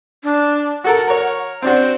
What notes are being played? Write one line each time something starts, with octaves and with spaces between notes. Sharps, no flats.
D4
F#4 A4 A#4 F#5
A#4 C#5
C4 D4 F#4 C5